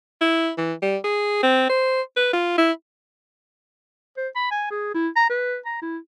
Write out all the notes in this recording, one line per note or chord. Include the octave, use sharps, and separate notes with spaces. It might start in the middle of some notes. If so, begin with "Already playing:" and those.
E4
E3
G3
G#4
C4
C5
B4
F4
E4
C5
B5
G#5
G#4
E4
A#5
B4
A#5
E4